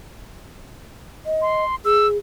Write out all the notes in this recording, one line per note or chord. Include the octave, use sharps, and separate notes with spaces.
D#5
C6
G#4 E6